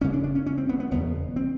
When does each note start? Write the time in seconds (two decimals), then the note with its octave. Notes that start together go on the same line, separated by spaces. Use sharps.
0.01 G1 F#2 C#3 C#4
0.13 D4
0.24 D4
0.35 C#4
0.46 C#4
0.58 C4
0.69 B3
0.80 B3
0.91 F#1 E2 B2 B3
1.36 C4